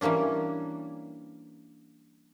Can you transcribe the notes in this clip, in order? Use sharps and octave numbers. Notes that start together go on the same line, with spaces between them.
E3 G3 A#3 C#4 D4